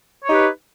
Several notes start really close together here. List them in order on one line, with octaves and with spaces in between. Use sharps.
C#5 D#4 G4 B4